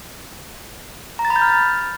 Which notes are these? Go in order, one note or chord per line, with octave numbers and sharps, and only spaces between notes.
A#5
A6
B5
G6
F6